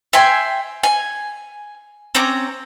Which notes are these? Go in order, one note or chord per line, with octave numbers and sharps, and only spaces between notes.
E5 G5 G#5 C6
G#5
C4 C#4 A#5 D6